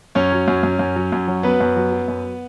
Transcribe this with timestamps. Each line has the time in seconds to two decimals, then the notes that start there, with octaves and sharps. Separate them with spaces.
0.15 F#2 C#4 C#5
0.32 F#3
0.48 F#2
0.63 F#2
0.79 F#2
0.96 F#3
1.12 F#2
1.28 F#3
1.43 F#3 B3 B4
1.60 F#2
1.76 F#3
1.92 F#3
2.08 F#2